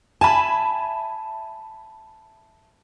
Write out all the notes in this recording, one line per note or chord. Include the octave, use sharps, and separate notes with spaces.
E5 G#5 A5 B5